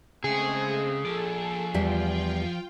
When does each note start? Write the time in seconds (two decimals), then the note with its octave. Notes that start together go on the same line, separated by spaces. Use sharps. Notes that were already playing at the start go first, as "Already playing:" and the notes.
0.24 C#3 G#3 A3 C4 G#4
1.05 F3 A4 D5
1.74 E2 G3 F4 E5 G5